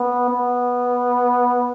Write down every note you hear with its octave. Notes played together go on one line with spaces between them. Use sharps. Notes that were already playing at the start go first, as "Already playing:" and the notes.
Already playing: B3
B3